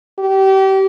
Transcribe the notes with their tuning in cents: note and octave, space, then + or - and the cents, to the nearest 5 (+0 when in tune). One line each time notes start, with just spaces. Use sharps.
G4 -30